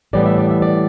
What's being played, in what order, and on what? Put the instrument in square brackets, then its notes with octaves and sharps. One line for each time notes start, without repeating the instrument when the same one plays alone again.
[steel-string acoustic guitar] A2 E3 G3 B3 D5
E5
D5
E5
D5